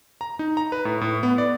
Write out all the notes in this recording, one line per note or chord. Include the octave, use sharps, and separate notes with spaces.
A#5
D#4
A#5
B4
A2
A2
B3
D5